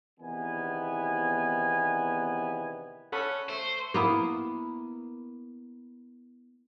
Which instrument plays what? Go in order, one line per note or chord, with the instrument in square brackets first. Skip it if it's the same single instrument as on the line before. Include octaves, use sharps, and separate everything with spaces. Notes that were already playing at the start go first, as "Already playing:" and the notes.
[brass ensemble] E2 C3 D#3 B3 G#5
[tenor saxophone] C#4 [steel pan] A4 F#5 B5
[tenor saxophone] A3 [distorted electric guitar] C5
[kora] A#3 B3 E4